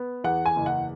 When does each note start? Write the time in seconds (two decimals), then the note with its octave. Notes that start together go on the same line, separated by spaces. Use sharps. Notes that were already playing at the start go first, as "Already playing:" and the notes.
Already playing: B3
0.24 E2 F#5
0.46 G#5
0.56 F#1
0.66 F#5